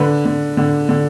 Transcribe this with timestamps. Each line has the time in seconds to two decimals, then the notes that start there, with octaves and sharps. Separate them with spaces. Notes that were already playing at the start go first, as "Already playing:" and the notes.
Already playing: D3 B4
0.25 D3
0.57 D3
0.89 D3